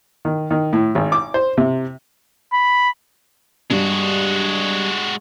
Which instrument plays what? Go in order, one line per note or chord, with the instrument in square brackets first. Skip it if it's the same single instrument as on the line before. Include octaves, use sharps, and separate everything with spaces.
[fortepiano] D#3
D#3
A2
G#1
D6
C5
C3
[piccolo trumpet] B5
[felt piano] G2 [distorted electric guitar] G#3 F#4